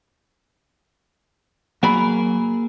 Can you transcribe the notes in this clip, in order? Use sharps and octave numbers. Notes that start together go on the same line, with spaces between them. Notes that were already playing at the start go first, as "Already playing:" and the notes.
F#3 A#3 G#4 A#4 B5